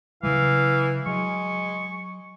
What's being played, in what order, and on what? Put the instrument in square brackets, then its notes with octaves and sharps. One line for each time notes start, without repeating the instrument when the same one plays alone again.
[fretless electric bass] C#3 F#3 G3 [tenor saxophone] E3 [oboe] F5
[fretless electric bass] F#3 [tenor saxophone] G#3 [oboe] C#6